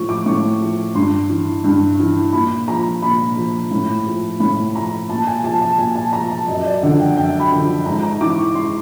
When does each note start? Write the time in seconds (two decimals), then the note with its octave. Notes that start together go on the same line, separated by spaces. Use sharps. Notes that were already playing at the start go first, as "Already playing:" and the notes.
Already playing: A2 F3 C#6
0.09 D6
0.26 A2 C#6
0.61 F3
0.95 G2 C6
1.29 E3
1.64 G2
1.99 E3
2.33 A#2 B5
2.68 F3 A#5
3.02 A#2 B5
3.37 F3
3.71 A2
4.06 F3
4.40 A2 B5
4.75 F3 A#5
5.09 A#2 A5
5.27 G#5
5.44 F3 A5
5.62 A5
5.79 A#2 G#5
5.96 A5
6.13 F3 A#5
6.30 A5
6.48 F#2 D#5
6.65 D5
6.83 D3 F3 F#5
6.99 G5
7.17 F#2 G5
7.40 B5
7.52 D3 F3
7.86 G#2 A#5
8.03 A#5
8.20 E3 D6
8.38 C#6
8.55 G#2 C6